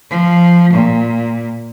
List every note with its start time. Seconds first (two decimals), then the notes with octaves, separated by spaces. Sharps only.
0.10 F3
0.73 A#2